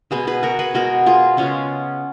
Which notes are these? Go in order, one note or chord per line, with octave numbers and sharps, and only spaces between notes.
B2 G#3 B3 G#4 B4
G#4 B4
F#4 A#4
G#4 B4
B2 G#3 B3 F#4 A#4
F4 G#4
C#3 G#3 B3 C#4 F4